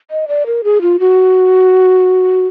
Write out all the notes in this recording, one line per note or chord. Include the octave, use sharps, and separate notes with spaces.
D#5
D5
A#4
G#4
F4
F#4